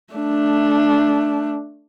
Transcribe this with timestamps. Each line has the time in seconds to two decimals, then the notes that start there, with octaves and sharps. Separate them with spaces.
0.14 A3 D4